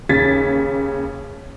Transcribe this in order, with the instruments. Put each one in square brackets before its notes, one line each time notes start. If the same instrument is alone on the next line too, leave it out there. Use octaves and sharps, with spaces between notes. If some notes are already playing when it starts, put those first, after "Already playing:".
[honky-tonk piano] D#2 C#3 G#6 A6 B6